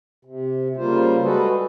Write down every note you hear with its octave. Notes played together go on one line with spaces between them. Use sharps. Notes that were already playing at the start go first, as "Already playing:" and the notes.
C3
C#3 G3 A#3 F4 C5
G3 G#3 F#4 G#4 A4 B4